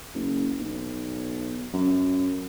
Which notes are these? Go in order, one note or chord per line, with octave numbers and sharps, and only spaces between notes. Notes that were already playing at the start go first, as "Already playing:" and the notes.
F#1
B1
F#2